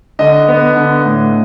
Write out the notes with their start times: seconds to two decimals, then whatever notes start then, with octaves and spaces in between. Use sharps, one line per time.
0.19 D3 D#5
0.48 B3
0.76 D3
1.05 A2